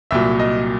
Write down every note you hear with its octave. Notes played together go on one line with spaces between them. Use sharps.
C2 A#2 F#3 E5
D#5